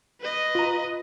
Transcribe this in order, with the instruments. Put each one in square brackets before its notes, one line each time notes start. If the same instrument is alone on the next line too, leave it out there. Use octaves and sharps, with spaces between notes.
[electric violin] B4 D#5
[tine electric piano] F4 A#5